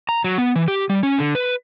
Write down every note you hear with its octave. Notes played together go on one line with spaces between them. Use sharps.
A#5
F#3
B3
E3
G4
G3
C#4
D3
B4